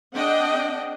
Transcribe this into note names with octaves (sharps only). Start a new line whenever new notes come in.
C4 D4 G#4 D#5 F#5 G5